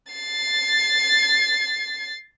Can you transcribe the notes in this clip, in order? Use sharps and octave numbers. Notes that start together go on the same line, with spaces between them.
A6 C7